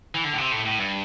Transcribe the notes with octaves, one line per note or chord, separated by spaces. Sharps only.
E3
D3
A2
C3
A2
A2
G2